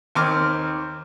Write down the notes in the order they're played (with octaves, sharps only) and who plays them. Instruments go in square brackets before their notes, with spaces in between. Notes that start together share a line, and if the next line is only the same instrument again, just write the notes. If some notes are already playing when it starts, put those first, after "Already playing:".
[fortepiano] D#2 C4 D6 F6